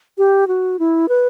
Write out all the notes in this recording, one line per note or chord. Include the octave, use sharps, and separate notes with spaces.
G4
F#4
E4
B4